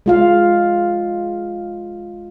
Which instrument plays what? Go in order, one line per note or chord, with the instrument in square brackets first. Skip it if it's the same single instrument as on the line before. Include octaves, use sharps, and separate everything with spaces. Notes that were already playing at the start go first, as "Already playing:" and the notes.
[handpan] G#3 F4 F5